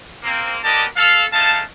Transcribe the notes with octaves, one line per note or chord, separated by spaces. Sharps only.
A#3 C4
B3 G4 A#4 D5 D#5 A5
A4 F5
G#3 A3 D#4 F5 A5